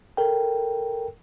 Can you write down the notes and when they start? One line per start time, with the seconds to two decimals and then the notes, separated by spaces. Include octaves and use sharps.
0.17 A4 A#4 G5